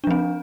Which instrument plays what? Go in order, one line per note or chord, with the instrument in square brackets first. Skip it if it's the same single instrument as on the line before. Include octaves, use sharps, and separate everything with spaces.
[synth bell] D4
F3
C4